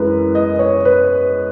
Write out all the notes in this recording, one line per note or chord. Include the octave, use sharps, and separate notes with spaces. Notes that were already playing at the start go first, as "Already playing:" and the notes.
Already playing: F#2 E3 G#3 A#4 B4
D#5
C#5
B4